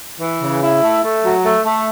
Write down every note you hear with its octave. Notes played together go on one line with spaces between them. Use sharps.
E3
C#3
E4
A3
A3
F#3
A3
A3